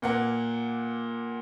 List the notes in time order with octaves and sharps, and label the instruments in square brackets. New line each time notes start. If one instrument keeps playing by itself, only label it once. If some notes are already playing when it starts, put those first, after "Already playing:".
[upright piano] A#2 A#3 F#5